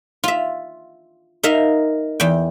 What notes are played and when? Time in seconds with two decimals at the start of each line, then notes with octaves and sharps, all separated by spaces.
0.24 F4 E5
1.43 D#4 A#4 E5 F5
2.20 E2 G5